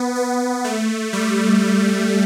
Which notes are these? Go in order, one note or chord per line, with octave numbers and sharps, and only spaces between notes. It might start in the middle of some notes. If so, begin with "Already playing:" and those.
Already playing: B3
B3
A3
G3